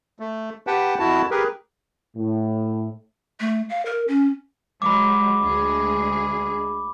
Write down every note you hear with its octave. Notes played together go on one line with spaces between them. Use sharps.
A3
G4 B4 F#5 G5 A5
F2 E4 F#4 A5
G4 G#4 A#4 B4
A2
A3
F5
A#4
C#4
F#3 G#3 B5 D6
D2 G#3 G#4